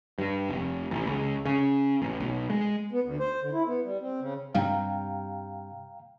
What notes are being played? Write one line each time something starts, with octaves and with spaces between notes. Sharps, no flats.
G2
F1
A1
C#2
C#3
A1
B1
G#3
B3
D2
C5
D3
E4
B3
G3
C4
C#3
G2 C3 G3 F5 G5 A#5